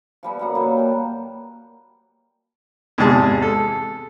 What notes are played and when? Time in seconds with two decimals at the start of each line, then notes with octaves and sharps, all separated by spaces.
0.23 F3 G3 B3
0.39 F#2 A#3 F#5
0.55 A#2 F#3 G3 A#3
0.76 G5 A5
2.98 E2 G#2 C3 G#4 A5
3.42 A4